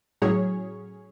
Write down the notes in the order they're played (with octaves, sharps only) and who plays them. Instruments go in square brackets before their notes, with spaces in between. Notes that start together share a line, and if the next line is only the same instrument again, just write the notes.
[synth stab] A2 F#3 C#4 G#4 C#5